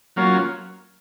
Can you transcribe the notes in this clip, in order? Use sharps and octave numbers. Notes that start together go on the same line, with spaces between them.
F#3 A#3 C#4 F4